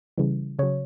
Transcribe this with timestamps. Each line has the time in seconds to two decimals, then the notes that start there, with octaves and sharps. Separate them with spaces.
0.17 C#3 E3 G3
0.59 C#3 C#5
0.63 F#3